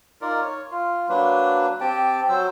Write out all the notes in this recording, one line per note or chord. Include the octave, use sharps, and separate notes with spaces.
D#4 F4 A#4 D5
C#5
F4
F#3 A#3 D4 B4
C4 G4 G5 A5
F#3 C5 E6